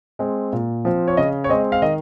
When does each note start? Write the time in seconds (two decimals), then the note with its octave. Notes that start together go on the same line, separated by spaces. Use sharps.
0.19 G#3 C4
0.53 A#2
0.85 F3 C4
1.08 C#5
1.17 C#3 D#5
1.44 C#5
1.49 G#3 C4 D#5
1.72 F5
1.82 D#3 D#5